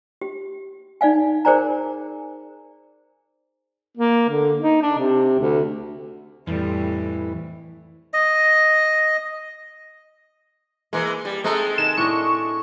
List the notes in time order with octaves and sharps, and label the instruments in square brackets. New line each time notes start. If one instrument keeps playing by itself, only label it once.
[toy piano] G4
D#4 D5 F5 G#5
G#4 A#4 C5 D5 G#5 A#5
[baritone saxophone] A#3
D3
D#4
D4
C3
D2
[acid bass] F2 [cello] A2 G3 [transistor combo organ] E3
[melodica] D#5
[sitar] E3 G#3 [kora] A#3
[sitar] G3
[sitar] G#3 A3 A4 [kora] C4 D#4
[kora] D#3 [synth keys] E7
[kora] A2 D4 D#5 [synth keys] C#6